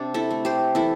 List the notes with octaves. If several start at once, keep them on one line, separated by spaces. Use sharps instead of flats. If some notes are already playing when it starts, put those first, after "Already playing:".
Already playing: C3 D4
E4 A4
A3
G4 C5
E3 E4 A4